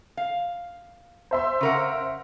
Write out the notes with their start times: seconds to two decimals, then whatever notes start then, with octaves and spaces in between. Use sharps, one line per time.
0.17 F5
1.31 C5 E5 C6
1.61 C#3 A#4 F#5